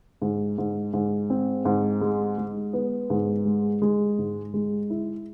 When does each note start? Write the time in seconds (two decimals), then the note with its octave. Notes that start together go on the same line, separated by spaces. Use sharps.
0.22 G#2
0.58 G#2
0.93 G#2
1.30 C4
1.65 G#2
2.01 G#3
2.38 G#3
2.73 B3
3.10 G#2
3.45 G#3
3.82 G#3
4.19 G#2
4.54 G#3
4.90 E4